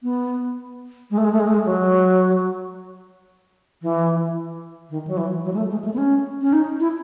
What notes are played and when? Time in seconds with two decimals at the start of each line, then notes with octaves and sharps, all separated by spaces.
0.03 B3
1.11 G#3
1.18 A3
1.25 G#3
1.33 A3
1.40 G#3
1.47 A3
1.54 G#3
1.65 F#3
3.82 E3
4.90 D#3
5.07 F#3
5.17 E3
5.45 F#3
5.54 G#3
5.58 A3
5.71 G#3
5.84 A3
5.94 B3
5.98 C#4
6.41 C#4
6.53 D#4
6.80 E4